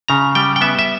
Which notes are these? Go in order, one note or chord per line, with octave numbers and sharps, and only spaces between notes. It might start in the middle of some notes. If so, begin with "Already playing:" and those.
C#3 A#5
G3 G5
G5
B3 E5
E5